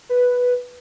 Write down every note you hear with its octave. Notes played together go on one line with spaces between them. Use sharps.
B4